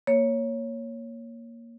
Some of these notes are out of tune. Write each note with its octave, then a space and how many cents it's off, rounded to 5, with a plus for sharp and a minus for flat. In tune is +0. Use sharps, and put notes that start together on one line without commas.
A#3 +0 C#5 +0